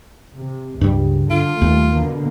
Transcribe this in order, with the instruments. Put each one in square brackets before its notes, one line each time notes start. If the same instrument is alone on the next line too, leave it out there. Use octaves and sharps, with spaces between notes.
[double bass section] C3
[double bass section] C#2 [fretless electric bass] G2 G3
[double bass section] D3 [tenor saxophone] F4
[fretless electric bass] D#2 [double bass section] G3 A3
[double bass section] B2 D3 A#3